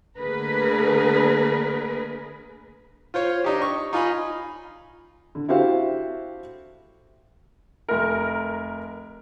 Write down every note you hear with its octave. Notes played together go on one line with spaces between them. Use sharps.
D3 A3 A#3 G#4 A#4 B4
F4 C5 C#5
D4 D#4 G4
C#6
D#4 F4 G#5 B5
D3
E4 F#4 G4 A4 C5 F5
F1 A#4